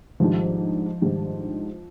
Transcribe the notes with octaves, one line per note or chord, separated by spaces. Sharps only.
G#2 D#3 F3 G3 D4
G#2 D#3 G3 D4